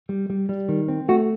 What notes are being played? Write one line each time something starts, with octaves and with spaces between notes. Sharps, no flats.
G3
G3
G3
D#3
C4
A3 F#4